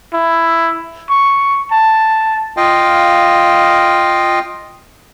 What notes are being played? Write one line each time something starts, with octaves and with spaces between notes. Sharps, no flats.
E4
C#6
A5
F4 D#5 F5 G5